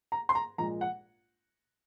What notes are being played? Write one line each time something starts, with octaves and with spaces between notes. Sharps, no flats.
A#5
C6
A#5
A#1 A#2 G#3 A#5
F#5